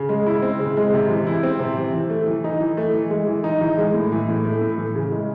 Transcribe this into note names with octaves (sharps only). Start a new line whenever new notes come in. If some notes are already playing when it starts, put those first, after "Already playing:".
Already playing: C#3
G#3
E4
C4
C#3
G#3
C3
E3
E4
C4
C3
E3
E3
A3
E3
D#4
E3
A3
E3
G#3
E3
D#4
E3
G#3
A2
E3
A2
A3
A2
E3
C#3
G#3